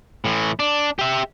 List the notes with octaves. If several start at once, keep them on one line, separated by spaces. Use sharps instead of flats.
A2 E3
D4
G4 E5